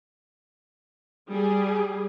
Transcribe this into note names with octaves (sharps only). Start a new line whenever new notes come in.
G3 G#4